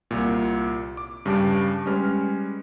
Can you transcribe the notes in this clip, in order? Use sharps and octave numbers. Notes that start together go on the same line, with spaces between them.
C2 A#2
D6
G2 C#3 G3 A5 D6 D7
G3 G#3 C#4 B4 F6